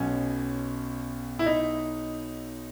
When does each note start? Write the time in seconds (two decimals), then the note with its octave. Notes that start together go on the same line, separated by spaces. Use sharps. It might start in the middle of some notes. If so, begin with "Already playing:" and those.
Already playing: B1 B2 C#4
1.39 E4
1.46 D#4